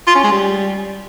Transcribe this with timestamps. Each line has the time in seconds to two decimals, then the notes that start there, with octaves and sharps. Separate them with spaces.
0.07 F4
0.15 C#4
0.23 G#3
0.32 G3